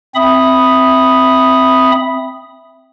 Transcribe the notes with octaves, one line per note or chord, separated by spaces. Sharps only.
C4 E5 B5 D#6